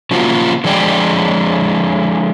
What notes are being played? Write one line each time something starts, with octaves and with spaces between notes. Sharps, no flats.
C#3 F3 F#3 A#3 F4 F#4
D3 F3 G#3 D5 G5